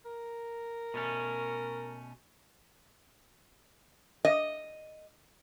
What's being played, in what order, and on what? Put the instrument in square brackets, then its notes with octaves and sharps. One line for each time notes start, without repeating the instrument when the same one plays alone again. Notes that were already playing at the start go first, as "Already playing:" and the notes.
[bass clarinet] A#4
[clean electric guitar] B2 A3 C#4
[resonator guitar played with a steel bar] D#5